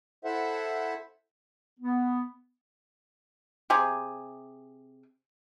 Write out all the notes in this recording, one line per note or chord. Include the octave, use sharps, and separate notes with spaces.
E4 A4 C5 E5 F#5
B3
C3 G4 G#4 G#5